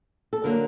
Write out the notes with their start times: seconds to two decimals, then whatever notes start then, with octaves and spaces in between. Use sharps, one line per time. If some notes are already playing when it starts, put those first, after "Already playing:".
0.33 A4
0.44 D3 F#3 A#3 A#4